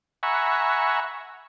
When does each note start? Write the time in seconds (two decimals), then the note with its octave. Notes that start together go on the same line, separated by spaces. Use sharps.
0.23 E5 F#5 G#5 A#5 B5 C#6